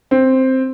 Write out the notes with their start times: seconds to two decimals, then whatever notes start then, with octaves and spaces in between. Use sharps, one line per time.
0.11 C4